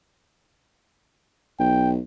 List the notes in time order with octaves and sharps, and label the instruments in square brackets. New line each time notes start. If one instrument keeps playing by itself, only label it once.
[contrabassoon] B1 [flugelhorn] G5